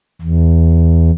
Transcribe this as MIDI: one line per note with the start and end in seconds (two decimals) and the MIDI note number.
0.21 1.11 40